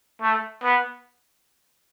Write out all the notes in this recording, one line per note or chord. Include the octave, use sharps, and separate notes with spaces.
A3
B3